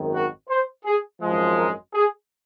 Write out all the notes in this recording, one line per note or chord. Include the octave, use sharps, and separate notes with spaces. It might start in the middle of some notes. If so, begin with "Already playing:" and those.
Already playing: G#1 F#2 D#3
F#4
C5
G#4
G#1 F#2 F3 G#3
A#4
G#4